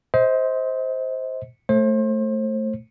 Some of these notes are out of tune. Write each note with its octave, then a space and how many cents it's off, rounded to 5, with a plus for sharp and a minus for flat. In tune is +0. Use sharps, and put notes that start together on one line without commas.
C5 +0 D#5 +35
A3 +0 C5 +35